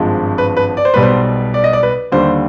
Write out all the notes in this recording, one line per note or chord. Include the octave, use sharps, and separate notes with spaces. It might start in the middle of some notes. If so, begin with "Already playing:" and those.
Already playing: G#1 G2 F3 G#3
B4
B4
D5
C5
B1 B2 G3 B4
C5
D5
D#5
D5
B4
D#2 D3 G3 C5